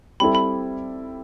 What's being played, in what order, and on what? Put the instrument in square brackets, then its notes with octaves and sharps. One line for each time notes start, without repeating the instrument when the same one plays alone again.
[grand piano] G3 C4 E4 A4 [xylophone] B5
[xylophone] B5